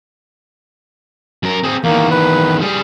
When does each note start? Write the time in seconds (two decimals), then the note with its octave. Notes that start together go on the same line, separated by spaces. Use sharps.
1.43 F#2 A#4
1.63 C4 G#4
1.84 E2 D#3 A#3
2.11 B4
2.61 G3 G#4